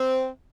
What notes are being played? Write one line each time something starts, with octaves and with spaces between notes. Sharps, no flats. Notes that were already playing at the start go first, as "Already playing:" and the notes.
Already playing: C4